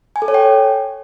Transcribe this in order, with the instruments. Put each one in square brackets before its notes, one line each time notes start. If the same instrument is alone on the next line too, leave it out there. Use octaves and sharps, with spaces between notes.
[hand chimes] G#5
A4
C#5
G5